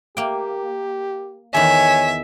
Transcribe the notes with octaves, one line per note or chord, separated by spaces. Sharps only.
A#3 G4 G5
E2 D#3 C#5 E5 G#5